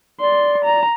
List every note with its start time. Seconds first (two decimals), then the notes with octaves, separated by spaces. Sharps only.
0.21 D5 C6
0.64 A#5